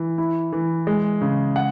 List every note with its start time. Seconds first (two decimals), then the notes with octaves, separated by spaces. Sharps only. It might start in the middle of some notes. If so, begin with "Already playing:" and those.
Already playing: E3
0.18 E4
0.53 E3
0.87 G#3
1.21 C#3
1.56 F#5